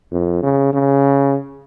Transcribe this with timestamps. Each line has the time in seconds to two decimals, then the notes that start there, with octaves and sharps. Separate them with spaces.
0.12 F2
0.43 C#3
0.73 C#3